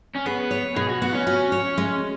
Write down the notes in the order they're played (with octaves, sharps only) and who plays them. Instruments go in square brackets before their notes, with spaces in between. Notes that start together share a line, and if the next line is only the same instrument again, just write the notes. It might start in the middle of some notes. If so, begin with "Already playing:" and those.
[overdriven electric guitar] C#4
[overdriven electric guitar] B3 [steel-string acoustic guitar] G#4
[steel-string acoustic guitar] C#5
[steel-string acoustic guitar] B2 [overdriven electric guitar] G#4
[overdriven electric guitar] F#4
[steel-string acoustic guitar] B3 [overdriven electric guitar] F#4
[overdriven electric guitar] C#4
[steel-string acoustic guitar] F#4
C#5
G#3